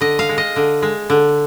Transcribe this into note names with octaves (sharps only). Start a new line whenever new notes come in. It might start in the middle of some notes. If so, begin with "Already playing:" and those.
D3 D#5
F5
G#3
D#5
D3
G#3
D3